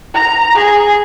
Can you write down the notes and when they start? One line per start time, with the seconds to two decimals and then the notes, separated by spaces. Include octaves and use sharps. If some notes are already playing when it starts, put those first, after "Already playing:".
0.14 A#5
0.55 G#4